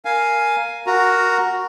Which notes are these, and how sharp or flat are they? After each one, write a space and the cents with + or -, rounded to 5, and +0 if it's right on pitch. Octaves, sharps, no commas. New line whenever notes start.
A#4 +0 F5 +0 G#5 +5
F#4 +0 A#4 +0 A#5 +0